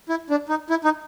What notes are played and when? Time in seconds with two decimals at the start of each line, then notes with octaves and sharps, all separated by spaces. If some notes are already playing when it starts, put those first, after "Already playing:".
0.09 E4
0.30 D4
0.49 D#4
0.70 E4
0.84 D#4